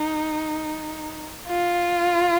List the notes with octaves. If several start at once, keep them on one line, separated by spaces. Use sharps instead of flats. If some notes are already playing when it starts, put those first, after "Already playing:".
Already playing: D#4
F4